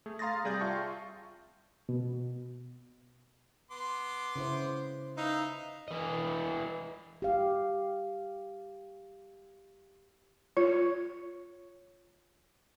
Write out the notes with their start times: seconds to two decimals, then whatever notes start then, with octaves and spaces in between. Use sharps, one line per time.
0.06 A3 G#4
0.19 F5 A#5 C6 D#6 A6 A#6
0.44 C3 G3 G#4 D5 G6 A#6
0.61 F4 E5 F5 G5 A5 C#6
1.89 B2
3.71 B3 C6 D6
4.36 C#3 E4 C5
5.17 D#4 B4 E5 F5
5.88 E3 D#5
7.22 G4 F5
10.57 F4 C#5